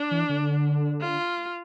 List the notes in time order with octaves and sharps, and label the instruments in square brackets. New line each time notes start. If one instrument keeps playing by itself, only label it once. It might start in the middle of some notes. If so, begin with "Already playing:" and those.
Already playing: [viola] D4
[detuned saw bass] E3
D3
[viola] F4